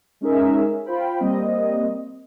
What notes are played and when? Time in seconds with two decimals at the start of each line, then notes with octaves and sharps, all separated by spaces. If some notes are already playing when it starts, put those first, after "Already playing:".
0.21 G#3 C#4 D#4 G#4 A#4 E5
0.86 F4 C5 G5 B5
1.20 G3 A#3 C4 D#5